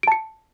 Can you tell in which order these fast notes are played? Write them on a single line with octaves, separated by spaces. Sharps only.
D7 A5 C#7